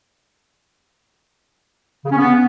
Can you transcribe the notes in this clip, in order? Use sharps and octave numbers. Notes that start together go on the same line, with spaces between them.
C#3
C#4
B3